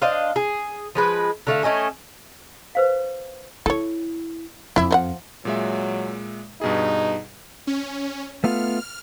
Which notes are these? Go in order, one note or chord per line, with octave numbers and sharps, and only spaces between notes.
D4 C5 D#5 F5
G#4
F3 G#3 B4
D3 A3 F5
A3 C#4 D#5 G#5
B4 C5 F5
E4 A4 C#5
F2 E4 E5
F3 D#5 F#5
A#2 F#3 G#3 E5
G2 B2 D#4 G#4
C#4
A3 B3 F4 F6